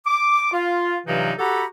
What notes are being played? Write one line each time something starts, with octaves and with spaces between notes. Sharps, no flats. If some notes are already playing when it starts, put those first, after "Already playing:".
D6
F4
G2 C3 E3 F#3 D#4 F4
F#4 G4 A4 F#5 A#5 B5